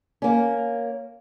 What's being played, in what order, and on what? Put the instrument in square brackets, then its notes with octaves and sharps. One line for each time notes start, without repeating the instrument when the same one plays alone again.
[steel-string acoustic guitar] A#3 C#4